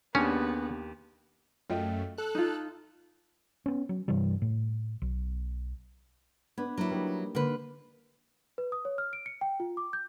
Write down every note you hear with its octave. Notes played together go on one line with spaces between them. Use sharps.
D#2 B3 C#4 D4 G4 G#4 G#5
F#2 A3 F4 D#5 G5
A4 F#6
D#4 F4
B3 C#4
F#3
G2 C3 E3 G3
A2
B1
B3 D4 B4 G#6
F#3 A#3 E4
G3 A#3 D#4
D3 A#3 B4 G6
B4
D#6
C#5
F6
D7
C#7
G5
F4
D6
G6